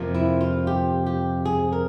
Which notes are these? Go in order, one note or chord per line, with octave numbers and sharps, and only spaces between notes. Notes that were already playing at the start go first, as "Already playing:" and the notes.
Already playing: F2 C3 F3 A#3
E4
F4
G4
G4
G#4
A#4